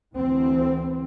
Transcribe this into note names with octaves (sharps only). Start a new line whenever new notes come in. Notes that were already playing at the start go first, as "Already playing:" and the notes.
D2 E3 C4